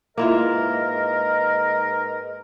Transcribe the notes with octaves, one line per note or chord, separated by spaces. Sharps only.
G#2 A#3 E4 F4 A#4 B4 D#5